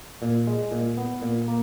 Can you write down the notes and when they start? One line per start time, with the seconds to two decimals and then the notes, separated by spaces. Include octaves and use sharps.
0.22 A#2
0.47 G#3
0.72 A#2
0.97 B3
1.22 A#2
1.48 A#3